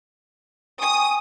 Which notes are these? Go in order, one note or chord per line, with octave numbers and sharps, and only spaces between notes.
G5 G#5 C#6 D#6